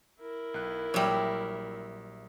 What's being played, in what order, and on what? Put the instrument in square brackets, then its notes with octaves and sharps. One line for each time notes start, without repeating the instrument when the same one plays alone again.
[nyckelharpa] E4 A#4
[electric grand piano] B1 F#6
[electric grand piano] A#1 E5 [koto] F#3 G3